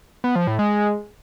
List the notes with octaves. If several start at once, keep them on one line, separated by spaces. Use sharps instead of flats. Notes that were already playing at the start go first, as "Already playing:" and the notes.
B3
F3
A2
G#3